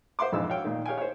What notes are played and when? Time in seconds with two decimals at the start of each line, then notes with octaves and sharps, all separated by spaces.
0.19 C5 E5 F#5 C6 D6
0.32 A#1 F2 G#2 B2 E4 E6
0.49 F#4 C#5 F5 G5
0.65 A#2 D#3
0.86 G4 C#5 F5 G5 G#5
0.98 C5 C#5